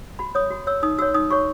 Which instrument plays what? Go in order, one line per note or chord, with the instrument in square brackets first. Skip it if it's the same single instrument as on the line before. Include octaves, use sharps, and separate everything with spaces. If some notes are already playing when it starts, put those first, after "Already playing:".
[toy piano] F#4 B5
C#5 D#6
F#4
C#5 E6
D#4 D#6
F#4 E6
C#5
D#4 D#6
F#4 C#5 C#6